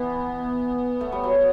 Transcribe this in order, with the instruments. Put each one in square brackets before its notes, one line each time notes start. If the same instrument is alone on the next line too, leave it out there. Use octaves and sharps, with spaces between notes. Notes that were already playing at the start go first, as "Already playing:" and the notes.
Already playing: [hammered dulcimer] E3 [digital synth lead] B3
[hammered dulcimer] A3
G3
F#3